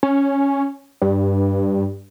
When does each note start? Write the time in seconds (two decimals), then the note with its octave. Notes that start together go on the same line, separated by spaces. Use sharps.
0.03 C#4
1.02 G2